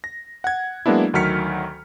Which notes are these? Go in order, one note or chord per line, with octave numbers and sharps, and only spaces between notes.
A#6
F#5 G#6
F#3 G#3 A#3 B3 D4 E4
D2 D#3 F#3 F6 B6 C#7